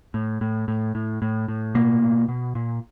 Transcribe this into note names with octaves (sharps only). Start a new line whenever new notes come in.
A2
A2
A2
A2
A2
A2
B2 A#3
B2
B2
A#2